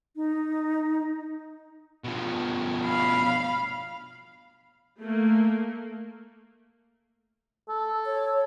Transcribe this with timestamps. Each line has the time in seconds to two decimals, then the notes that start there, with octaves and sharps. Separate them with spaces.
0.16 D#4
2.04 B2 F3
2.85 F5 B5
5.00 A3 A#3
7.69 A4
8.06 C#5